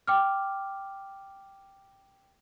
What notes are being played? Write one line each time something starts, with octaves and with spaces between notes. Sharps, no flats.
G5 D6 F6